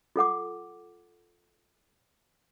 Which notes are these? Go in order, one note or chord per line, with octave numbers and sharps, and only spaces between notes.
F4 A4 F#5 D6